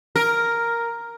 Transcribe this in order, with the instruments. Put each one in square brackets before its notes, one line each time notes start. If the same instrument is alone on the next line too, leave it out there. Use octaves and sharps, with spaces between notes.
[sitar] A#4